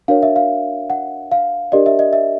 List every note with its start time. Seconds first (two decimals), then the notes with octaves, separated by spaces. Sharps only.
0.08 D4 F#4 A#4 C#5 F5
0.23 E5
0.36 F5
0.90 F#5
1.32 F5
1.72 D4 G4 A#4 D5 D#5
1.86 E5
1.99 D#5
2.13 E5